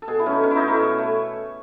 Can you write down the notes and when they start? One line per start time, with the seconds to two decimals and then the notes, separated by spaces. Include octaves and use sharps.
0.02 A4
0.07 B2 G#4
0.19 E4
0.26 A3 C#4
0.32 D#4
0.43 B2 C#4
0.51 E4
0.56 D#4
0.62 A3
0.68 E4
0.80 B2
0.98 A3